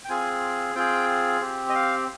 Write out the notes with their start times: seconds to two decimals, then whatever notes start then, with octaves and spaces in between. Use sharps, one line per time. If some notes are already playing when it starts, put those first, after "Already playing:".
0.05 G5
0.09 C4 F4 G#4 G#5
0.75 C4 F4 G#4 G5
1.41 C4 G4
1.69 D#5
1.75 F5